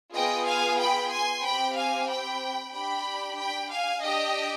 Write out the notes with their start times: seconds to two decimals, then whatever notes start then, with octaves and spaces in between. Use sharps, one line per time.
0.13 B3 F4 G#4 D#5 G5
0.46 F5 G#5
0.78 G5 B5
1.10 G#5 C6
1.43 C4 G4 G5 B5
1.75 F5 G#5
2.09 G5 B5
2.73 D4 G4 G5 B5
3.37 G5 B5
3.70 F5 G#5
4.02 D4 G4 D#5 G5